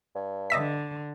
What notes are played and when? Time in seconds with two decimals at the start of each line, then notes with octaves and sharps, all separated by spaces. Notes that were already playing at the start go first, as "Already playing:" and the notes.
0.15 G2
0.50 D3 D#5 E5 B6